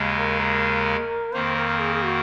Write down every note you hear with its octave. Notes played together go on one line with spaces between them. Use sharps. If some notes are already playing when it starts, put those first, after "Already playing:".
Already playing: D#2 C#3 G#3
A#4
A#4
F2 D#3 A#3 C5
A#4
G#4
G#4
F#4